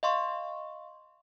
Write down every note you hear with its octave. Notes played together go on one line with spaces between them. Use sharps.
D#5 F5 C6 C#6